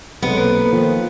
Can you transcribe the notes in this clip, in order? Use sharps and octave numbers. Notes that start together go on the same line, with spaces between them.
B1 C3 G#3 B3 G4 A4 C#5
A#3 A4 B4 C5
D#3 F3